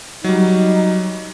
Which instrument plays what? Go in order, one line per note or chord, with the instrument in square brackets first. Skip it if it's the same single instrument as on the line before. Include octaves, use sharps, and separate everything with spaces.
[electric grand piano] F#3 G3 [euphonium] D#4